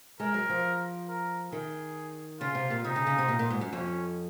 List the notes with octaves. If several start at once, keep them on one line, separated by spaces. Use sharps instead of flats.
G#3 A#4
F#3
F3
A#4
D#3 G#4
C#3 F4
C3
A#2
C3 D#4
C#3
C#3
C3
A#2
A#2
G#2
F#2
F2 C#4